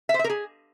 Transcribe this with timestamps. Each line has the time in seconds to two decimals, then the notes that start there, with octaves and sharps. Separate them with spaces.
0.09 E5
0.14 C5
0.19 E5
0.24 A#4
0.30 G#4